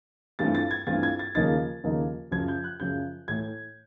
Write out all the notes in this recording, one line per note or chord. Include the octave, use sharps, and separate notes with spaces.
G2 E3 A3 C4 F4 A6
A6
G#6
G2 E3 A3 C4 F4 A6
G#6
A6
D#2 C#3 F3 A#3 D#4 A6
D#2 C#3 F3 A#3 D#4
F#2 C#3 F3 G#6
G6
F#6
F#2 C#3 F3 G6
A2 E3 A3 G#6